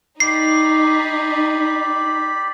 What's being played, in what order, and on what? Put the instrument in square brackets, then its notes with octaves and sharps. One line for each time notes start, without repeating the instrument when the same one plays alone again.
[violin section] D#4 [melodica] G4 D5 B5 [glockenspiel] C7